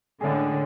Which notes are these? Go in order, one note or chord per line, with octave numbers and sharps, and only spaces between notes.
A2 D3 G#3 C#4 G#4